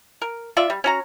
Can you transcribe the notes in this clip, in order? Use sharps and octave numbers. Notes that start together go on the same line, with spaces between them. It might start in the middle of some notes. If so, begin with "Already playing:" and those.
A#4
F4 D5 E5
G3
C#4 F#4 A#5